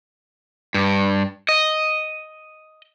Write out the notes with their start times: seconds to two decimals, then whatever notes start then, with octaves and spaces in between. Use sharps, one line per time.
0.74 G2
1.49 D#5